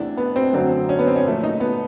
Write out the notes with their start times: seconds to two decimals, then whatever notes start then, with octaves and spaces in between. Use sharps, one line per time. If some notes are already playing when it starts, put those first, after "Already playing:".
Already playing: E2 C3 E3 A3 D4
0.17 B3
0.36 C4
0.53 F#2 D3 F#3 A3 C4
0.89 C#4
0.99 B3
1.07 C4
1.16 C#4
1.25 A#2 F3 A3
1.44 D#4
1.60 B3